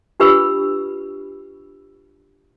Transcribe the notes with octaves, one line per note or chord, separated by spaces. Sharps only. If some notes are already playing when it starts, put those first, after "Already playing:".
D4 F4 G4 B4 B5 E6